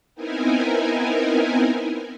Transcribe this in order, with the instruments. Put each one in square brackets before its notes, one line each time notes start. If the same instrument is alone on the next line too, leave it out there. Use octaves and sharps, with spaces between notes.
[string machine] B3 C4 D#4 E4 A#4 G#5